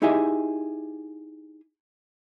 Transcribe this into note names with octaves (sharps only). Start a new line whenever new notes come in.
D#4 E4 G4 G#4 D#5 E5